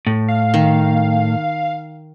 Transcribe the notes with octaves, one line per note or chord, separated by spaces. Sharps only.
A2
F5
D#3